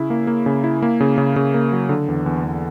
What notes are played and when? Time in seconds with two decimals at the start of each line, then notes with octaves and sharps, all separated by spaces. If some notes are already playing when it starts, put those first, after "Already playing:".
Already playing: C#3 E4
0.10 A#3
0.27 A#3
0.46 C#3
0.64 E4
0.82 A#3
1.00 C#3
1.18 C#3
1.36 C#3
1.54 A#3
1.72 F#3
1.89 D3
2.08 E2
2.26 E2
2.44 E2